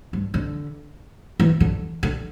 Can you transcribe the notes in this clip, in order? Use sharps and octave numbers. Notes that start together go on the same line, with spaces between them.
G2
D3
E3
D3
D3